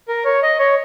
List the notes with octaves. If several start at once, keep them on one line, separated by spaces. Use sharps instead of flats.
A#4
C#5
D#5
C#5